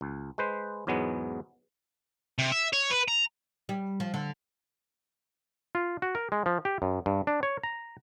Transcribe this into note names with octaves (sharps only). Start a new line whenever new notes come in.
C#2
G#3 B4 C5
E2 G#2 F#3 G#3 B3
C3
E5
C#5
B4
A#5
G3
F3
D3
F4
F#4
A#4
G#3
F3
G4
F#2
G2
D4
C#5
A#5